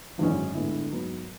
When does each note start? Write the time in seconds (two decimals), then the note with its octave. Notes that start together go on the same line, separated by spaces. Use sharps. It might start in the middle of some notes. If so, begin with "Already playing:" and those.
0.18 G#1 F#2 D3 E3 G#3 C#4
0.54 A2 D3 G#3 B3 E4
0.91 G#2 F#3 B3